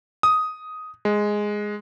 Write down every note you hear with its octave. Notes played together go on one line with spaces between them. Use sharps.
D#6
G#3